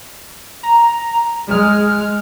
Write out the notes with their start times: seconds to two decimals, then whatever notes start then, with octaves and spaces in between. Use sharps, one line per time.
0.63 A#5
1.51 G#3 F6